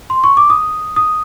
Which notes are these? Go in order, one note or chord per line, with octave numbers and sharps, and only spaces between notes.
C6
C#6
D6
D#6
D#6